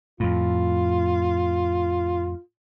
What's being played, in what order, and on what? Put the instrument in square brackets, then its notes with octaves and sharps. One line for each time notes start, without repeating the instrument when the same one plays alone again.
[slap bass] F2 A2 [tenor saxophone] F4